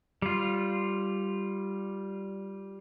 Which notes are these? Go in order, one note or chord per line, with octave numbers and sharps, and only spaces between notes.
G3 F4